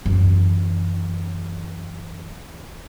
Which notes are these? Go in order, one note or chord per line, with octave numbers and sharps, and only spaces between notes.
F#2 E3